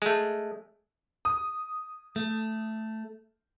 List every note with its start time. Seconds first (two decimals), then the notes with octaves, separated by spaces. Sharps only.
0.02 G#3 A3
1.25 D#6
2.16 A3